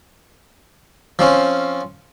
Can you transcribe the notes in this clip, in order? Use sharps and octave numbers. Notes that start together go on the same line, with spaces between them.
F3 C4 C#4